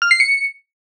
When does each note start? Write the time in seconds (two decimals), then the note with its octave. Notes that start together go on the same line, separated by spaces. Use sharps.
0.02 F6
0.11 C7
0.20 C#7